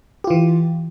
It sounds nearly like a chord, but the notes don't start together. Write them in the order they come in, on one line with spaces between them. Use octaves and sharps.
G4 F4 E3